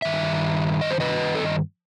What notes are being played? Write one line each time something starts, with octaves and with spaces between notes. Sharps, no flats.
G2 D#3 E5
D#5
C5
B4 D#5
A4